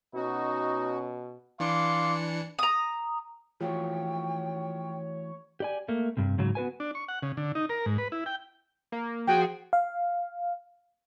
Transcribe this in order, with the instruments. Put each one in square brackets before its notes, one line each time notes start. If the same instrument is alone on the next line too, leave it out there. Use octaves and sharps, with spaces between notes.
[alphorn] B2 [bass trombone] C#4 [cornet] D#4 [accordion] F#4
[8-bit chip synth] E3 D4 C#7 [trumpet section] F5 C6 D6
[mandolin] A#5 D#6
[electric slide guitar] E3 A3 F#4 [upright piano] F3 [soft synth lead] C#5 [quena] G5
[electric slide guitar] G4 D5 G#5
A3 A#3
G2 C3
G#2 C#3 F#3
B3 F#4 B4 G#5
[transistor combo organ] D4
C#6
F#5
C#3
D3
D#4
A#4
G#2
B4
E4
G5
[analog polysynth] A#3
[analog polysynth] F3 F#4 G#4 [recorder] G5
[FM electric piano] F5